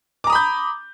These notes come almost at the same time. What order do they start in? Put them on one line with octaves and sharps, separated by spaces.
D6 A#5 D#6 B5 G6